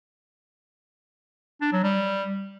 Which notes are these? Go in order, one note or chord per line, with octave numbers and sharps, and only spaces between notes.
D4
F#3
G3